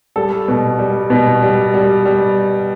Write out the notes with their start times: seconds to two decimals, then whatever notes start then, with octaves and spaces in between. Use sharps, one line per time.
0.16 G3 A4
0.48 B2
0.79 G3
1.10 B2
1.42 G3
1.74 G3
2.06 G3